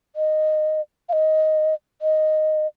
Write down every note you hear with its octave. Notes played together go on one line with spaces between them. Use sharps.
D#5
F5
D#5
D#5